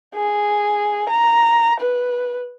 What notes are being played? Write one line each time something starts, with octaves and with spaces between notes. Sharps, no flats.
G#4
A#5
B4